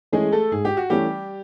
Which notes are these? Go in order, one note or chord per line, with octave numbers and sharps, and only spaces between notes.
E3 G#3 A3 C#4 G#4
A3 A4
G#2 G#4
G4
F#4
E3 G3 A3 C#4 G4